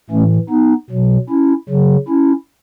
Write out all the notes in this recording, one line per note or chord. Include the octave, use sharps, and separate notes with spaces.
A2 E3 A3 C#4
B3 D#4
B2 F#3
C#4 E4
C#3 F#3
C#4 E4